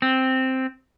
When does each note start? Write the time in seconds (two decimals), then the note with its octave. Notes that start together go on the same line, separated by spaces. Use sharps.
0.02 C4